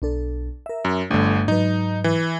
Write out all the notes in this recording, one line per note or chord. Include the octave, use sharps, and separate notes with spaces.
B1 D4 A4
A#4 E5
F#2
G1 G2 D3 A3 D4
G#2 F#3 D#4 B4
E3